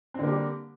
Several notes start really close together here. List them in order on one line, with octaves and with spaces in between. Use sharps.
C4 D3 A#3 G4 G3